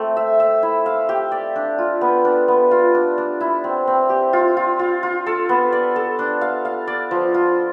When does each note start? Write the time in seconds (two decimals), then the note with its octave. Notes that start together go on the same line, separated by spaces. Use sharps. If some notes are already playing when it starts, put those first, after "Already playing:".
Already playing: A3 C4
0.17 E5
0.40 E5
0.63 E4
0.86 F5
1.09 G4
1.32 D5
1.56 D4
1.78 F4
2.01 B3
2.25 D4
2.48 B3
2.71 F4
2.94 D4
3.18 D4
3.41 E4
3.64 C4
3.87 C4
4.09 G4
4.33 F4
4.57 F4
4.79 F4
5.03 F4
5.26 A4
5.49 B3
5.72 D5
5.96 A4
6.19 D4
6.41 F5
6.65 F5
6.87 D5
7.11 F3
7.34 F4